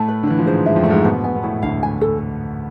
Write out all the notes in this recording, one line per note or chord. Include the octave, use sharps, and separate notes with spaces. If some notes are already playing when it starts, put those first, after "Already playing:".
Already playing: A2 A3 A5
B4
D3
E3 B4
F3
G#2 G#3 C5
G#3 E5
F2 F3
A3 D4
G#2 G#3
B2 B3 C5
B2 B3 G#5
B3
A2 A3 E4
D2 D3 F5
G#5
A4